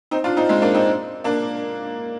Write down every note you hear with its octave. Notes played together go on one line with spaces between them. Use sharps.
C4 D#4
D4 F4
C4 D#4
G#3 C4
A#3 D4
C4 D#4
A#3 D4